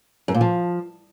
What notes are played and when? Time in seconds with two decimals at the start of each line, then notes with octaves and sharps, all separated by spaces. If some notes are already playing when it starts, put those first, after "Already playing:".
0.28 F#2
0.34 A#2
0.41 F3